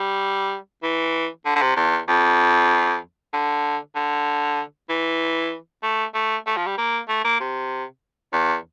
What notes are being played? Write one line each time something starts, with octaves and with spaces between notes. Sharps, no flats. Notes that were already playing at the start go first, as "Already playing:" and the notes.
Already playing: G3
E3
D3
D3
C3
E2
F2
D3
D3
E3
A3
A3
A3
F3
G3
A#3
A3
A#3
C3
E2